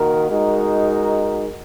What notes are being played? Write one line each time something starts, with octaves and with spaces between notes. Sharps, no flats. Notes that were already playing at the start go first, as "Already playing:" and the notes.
Already playing: D#3 A#3 F#4 A#4
G#3 D#4 F#4 A#4